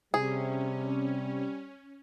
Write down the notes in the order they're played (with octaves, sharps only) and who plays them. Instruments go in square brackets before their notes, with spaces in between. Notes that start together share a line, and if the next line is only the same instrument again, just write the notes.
[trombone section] C3 [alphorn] G3 [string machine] C#4 [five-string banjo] G#4